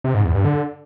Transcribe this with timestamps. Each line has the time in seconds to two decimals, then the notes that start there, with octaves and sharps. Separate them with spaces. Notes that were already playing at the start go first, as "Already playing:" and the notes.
0.04 C3
0.14 G#2
0.25 E2
0.35 G2
0.45 D3